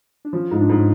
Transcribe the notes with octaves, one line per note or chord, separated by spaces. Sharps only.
D4
F3 C#4
G#2 F4
D4
G#2
C#4